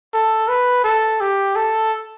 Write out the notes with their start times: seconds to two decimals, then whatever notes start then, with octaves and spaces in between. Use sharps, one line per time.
0.13 A4
0.48 B4
0.84 A4
1.21 G4
1.56 A4